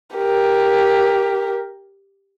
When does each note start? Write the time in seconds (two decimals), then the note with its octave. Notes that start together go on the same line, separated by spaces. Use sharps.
0.16 G4 A#4